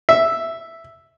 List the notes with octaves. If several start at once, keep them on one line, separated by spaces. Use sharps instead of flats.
E5